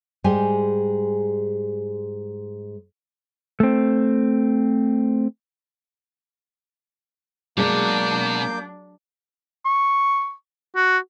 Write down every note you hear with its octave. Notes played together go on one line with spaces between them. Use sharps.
G#2 G3 G#3 G4 G#5
A3 C4
B2 F#3 G#3 A#3 D4 D6 G6
C#6
F#4